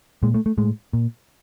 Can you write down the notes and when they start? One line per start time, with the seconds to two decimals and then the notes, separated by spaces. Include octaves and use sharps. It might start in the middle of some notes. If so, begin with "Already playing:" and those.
0.23 A#2 G#3
0.34 A3
0.46 A3
0.58 A2 G#3
0.93 A#2